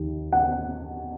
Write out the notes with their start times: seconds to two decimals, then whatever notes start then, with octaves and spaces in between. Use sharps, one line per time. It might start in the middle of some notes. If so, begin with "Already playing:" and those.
Already playing: D#2 D#3
0.32 F#5